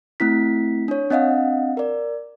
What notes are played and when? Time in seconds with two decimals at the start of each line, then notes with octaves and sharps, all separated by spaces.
0.20 A3 C4 E4 B6
0.88 D4 C#5
1.10 C4 D4 D#5 F5 F#5
1.77 A#4 D5